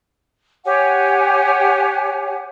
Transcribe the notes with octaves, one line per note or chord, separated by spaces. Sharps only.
G4 C#5 F#5 G#5